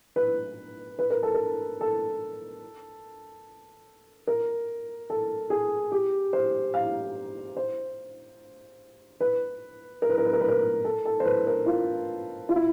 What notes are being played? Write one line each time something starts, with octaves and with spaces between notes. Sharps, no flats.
B4
B4
A#4
A4
A#4
A4
A#4
A4
G#4
G4
C5
F5
C5
B4
A#4
B4
A#4
B4
A#4
B4
A#4
A4
A4
C5
B4
A#4
F4
F4
E4